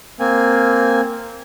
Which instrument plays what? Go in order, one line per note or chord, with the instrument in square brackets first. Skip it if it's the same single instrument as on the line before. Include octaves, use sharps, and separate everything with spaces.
[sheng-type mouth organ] A#3 C4 G#5